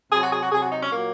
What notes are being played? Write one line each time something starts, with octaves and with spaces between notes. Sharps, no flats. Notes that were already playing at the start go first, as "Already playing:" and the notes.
C3 F#3 G#4
F#4
G#4
F#4
C3 F#3 G#4
F#4
D#4
C#4
A#2 F#3 A#3